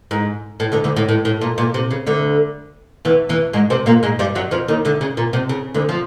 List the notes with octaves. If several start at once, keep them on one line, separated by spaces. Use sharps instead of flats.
G#2
A2
D2 D3
D2 D3
A2
A2
A2
A#2
A#2
C3
C#3
D2 D3
E2 E3
E2 E3
G#2 G#3
C3 C4
A#2 A#3
G#2 G#3
G2 G3
F#2 F#3
F2 F3
D#2 D#3
D2 D3
C#3
A#2
C3
C#3
D2 D3
F3